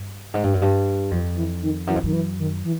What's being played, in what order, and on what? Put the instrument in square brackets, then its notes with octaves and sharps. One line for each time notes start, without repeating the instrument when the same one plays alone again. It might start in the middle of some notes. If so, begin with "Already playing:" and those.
Already playing: [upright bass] G2
G#2
G2
F#2
G2
[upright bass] F2 [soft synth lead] F3
[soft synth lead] E3
D#3
[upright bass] F#2 [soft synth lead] E3
[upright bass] F2
[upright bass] F#2 [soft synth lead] D#3
[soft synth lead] E3
D#3
E3